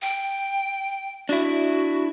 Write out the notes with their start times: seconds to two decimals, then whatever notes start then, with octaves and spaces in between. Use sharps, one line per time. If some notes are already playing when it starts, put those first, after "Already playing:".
0.02 G5
1.29 D4 E4 F#4